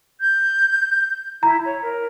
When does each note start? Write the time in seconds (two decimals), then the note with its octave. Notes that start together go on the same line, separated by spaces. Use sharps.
0.21 G6
1.43 E4 A#5
1.65 C#5
1.82 A#4